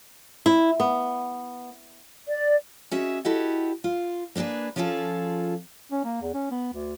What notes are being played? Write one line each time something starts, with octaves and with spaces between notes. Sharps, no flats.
E4
B3
D5
C#4 F#4 G#4 D#5 E5
E4 F#4 G4 A4 D#5 F#5
F4
A#3 B3 D4 G#4 B4
F3 C#4 F4 G#4 A4
C#4
A#3
E2
C#4
B3
D2